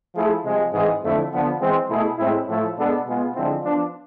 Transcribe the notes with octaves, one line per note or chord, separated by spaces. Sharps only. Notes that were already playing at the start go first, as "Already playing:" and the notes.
F3 A3 E4 G#4
C3 F3 G#3
G#2 E3 G#3 C4 G#4
F2 D3 F3 A3 E4
D3 F3 B3
E3 G#3 C4
B2 A3 E4 G#4
A2 G#3 C4 E4
A2 F3 A3 E4 A4
B2 G#3 B3 D4 A4
B2 G#3 B3 F4 G#4
D3 F3 G#3 C4 E4
F3 B3 D4